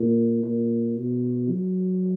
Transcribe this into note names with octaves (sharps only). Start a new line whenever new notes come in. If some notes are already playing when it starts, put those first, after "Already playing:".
Already playing: A#2
A#2
B2
F#3